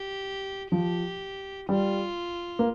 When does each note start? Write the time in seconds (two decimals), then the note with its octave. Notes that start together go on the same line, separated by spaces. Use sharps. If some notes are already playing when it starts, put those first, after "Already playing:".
Already playing: G4
0.72 F3 G4
1.69 G3 F4
2.59 A#3